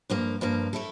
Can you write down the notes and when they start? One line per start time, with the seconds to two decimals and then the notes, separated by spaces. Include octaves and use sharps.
0.10 G2 F3 A#3
0.41 G2 F3 A#3
0.73 A3 E4 A4